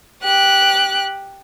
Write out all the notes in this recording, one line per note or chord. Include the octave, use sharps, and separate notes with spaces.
G4 F#6